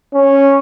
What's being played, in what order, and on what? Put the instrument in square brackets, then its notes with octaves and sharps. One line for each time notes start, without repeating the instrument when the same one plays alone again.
[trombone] C#4